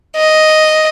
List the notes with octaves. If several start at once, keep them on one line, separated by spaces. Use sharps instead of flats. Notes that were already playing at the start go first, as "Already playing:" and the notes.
D#5